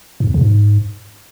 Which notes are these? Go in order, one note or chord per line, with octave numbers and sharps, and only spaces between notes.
G#2
E2
C#3
G#2